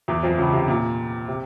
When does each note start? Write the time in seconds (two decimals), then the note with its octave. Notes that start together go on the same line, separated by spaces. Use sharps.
0.08 E2 E3
0.23 F2 F3
0.38 C#2 C#3
0.53 C3
0.68 A#2
1.28 C3